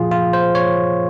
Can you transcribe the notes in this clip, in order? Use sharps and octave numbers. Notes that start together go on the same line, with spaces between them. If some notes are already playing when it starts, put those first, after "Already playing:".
Already playing: A#2 F3 F4 G#4
F4
C5
C#5